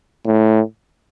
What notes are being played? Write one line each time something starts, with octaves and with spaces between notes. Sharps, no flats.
A2